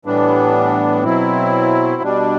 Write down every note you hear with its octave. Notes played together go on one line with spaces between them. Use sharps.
A2 E3 G3 B3 D4
B2 F#3 C4 E4
B2 G3 D4